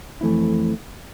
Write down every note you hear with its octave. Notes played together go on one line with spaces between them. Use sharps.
F2 E3 A3 C4 E4